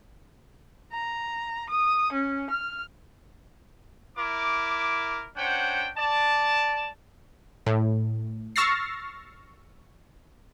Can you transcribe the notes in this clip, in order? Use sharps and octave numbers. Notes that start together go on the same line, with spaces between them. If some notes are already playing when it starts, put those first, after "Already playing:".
A#5
D#6
C#4
F6
E4 A#4 D6
C#4 D4 C5 F#5 G5
D5 A5
A2
C#6 E6 F6 A6 A#6 C7